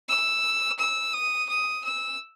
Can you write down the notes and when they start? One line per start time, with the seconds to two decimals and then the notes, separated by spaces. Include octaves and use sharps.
0.08 E6
0.79 E6
1.14 D#6
1.49 D#6
1.84 E6